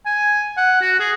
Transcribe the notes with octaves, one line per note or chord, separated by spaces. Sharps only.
G#5
F#5
F#4
G#4